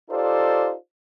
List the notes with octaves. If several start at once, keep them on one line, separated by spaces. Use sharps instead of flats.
D#4 F4 G4 A4 C5 D5